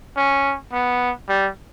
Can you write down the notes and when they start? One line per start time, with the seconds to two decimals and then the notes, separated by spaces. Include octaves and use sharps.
0.16 C#4
0.72 B3
1.29 G3